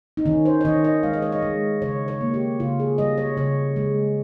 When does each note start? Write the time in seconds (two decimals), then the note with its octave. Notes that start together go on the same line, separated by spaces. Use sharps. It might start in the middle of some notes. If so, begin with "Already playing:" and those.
0.17 D#4
0.25 D#3 C#4
0.45 C5
0.61 C#5
0.65 D#3 D#5
0.84 D#5
1.03 G#3 F5
1.13 D#5
1.22 C#5
1.32 D#5
1.42 G#3
1.82 C#3 C#5
2.08 C#5
2.21 A#3
2.34 G4
2.60 C#3 F4
2.80 G#4
2.98 G3 D#5
3.18 C#5
3.37 C#3 C#5
3.76 G#3